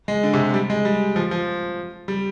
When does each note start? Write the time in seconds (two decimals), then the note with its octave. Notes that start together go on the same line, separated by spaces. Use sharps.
0.08 G#3
0.23 D3
0.34 C3
0.54 G3
0.70 G#3
0.85 G3
1.16 F3
1.31 F3
2.08 G3